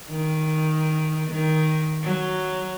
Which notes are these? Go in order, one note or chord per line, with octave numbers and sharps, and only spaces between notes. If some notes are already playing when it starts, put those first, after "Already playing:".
D#3
D#3
F#3